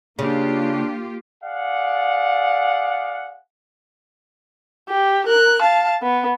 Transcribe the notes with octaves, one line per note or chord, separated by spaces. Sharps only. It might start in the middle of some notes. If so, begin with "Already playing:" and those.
C#3 A#3 D4 F4 G4
G#4 D5 F5 F#5
G4
A#4 F#6
F5 A5
B3